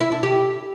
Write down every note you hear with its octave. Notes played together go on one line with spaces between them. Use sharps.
E4
D4
G4